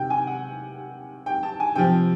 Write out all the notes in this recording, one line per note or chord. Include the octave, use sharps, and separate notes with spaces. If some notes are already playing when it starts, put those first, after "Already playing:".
Already playing: C3 D#3 G5
G#5
F#5
G5
A5
G#5
C3 F3 G5